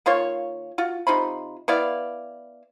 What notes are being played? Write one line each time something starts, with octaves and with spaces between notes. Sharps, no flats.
D#3 A#3 F4 C#5
F4 F#4
C3 D#4 F4 B5
B3 E4 D5 F5